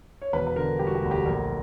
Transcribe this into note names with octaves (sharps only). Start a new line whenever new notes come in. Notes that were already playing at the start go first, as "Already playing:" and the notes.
C#5
E1 B4
B4
D3 A#4
G3 G4
F#4
G4
D2
G4
A#1 A#4